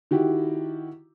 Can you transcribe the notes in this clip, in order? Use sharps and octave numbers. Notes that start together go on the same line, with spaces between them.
D#3 E4 F#4 G4